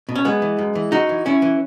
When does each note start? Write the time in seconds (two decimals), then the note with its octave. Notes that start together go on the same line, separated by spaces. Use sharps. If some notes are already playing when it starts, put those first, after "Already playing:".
0.09 B2
0.15 C#4
0.25 F#2 G#3 B3
0.42 E3
0.59 F#2
0.75 E3
0.92 F#2 D#4 F#4
1.09 E3
1.26 F#2 C#4 E4
1.42 E3